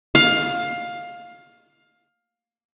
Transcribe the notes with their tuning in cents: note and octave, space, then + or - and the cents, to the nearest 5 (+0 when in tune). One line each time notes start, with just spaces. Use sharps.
F5 +15